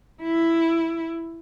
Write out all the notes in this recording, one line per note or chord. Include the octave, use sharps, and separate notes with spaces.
E4